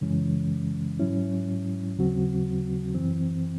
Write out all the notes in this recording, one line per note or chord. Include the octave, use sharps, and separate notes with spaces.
F#2 C#3 E3 G#3 C#4
G#2 F#3 C#4 E4
D#2 C#3 F#3 C4 F#4
F#2 E3 C4